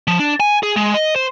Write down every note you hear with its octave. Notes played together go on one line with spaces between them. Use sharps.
F3
D4
G#5
G#4
G#3
D#5
C5